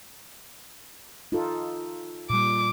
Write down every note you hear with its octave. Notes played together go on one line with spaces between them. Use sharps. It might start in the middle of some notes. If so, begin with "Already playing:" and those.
D#4 F4 A4
A#2 G3 D6